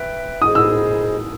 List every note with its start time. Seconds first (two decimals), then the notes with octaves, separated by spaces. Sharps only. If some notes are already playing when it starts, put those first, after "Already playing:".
Already playing: B4 E5 G5
0.42 F4 G#4 C5 D#5 D#6
0.55 E6